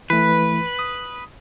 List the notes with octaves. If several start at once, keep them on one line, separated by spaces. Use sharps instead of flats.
E3 A3 B4
D#6